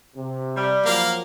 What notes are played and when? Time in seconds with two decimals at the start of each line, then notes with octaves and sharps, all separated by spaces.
0.16 C3
0.55 G3
0.85 F3 F#3 A#3 F5